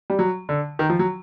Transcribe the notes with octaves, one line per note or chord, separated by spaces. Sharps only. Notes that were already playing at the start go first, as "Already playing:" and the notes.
G3
F#3
D3
D#3
F3
F#3